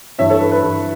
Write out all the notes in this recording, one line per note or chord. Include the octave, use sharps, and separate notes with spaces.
G2 E3 C#5 E5
A4 C#5
B4
B4
G2 E3 B4